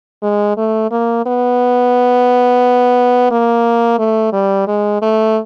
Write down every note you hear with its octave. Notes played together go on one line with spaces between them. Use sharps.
G#3
A3
A#3
B3
A#3
A3
G3
G#3
A3